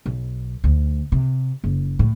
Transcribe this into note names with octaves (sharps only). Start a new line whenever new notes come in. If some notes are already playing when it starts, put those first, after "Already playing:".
B1
D2
C3
F#1
A2